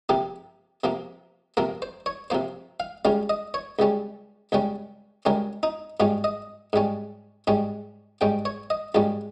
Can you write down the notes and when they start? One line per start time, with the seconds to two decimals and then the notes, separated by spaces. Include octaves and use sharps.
0.09 C3 F3 A#3 G4
0.84 C3 F3 A#3
1.57 C3 F3 A#3 A#4
1.82 C5
2.06 C#5
2.30 C3 F3 A#3 C5
2.80 F5
3.05 C#2 C#3 G3 C#4 F5
3.29 D#5
3.54 C#5
3.79 C#2 C#3 G3 C#4
4.52 C#2 C#3 G3 C#4
5.25 C#2 C#3 G3 C#4 A#4
5.63 D#4
6.00 G#2 G3 C#4 F4
6.24 D#5
6.73 G#2 G3 C#4
7.47 G#2 G3 C#4
8.21 G#2 G3 C#4 G5
8.45 C#5
8.70 D#5
8.95 A#1 G#2 G3 C#4 F4